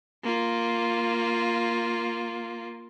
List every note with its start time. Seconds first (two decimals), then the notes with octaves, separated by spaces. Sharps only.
0.24 A#3 F4